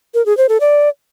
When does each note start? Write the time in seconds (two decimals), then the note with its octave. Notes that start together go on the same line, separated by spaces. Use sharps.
0.14 A#4
0.26 G#4
0.37 C5
0.49 A4
0.60 D5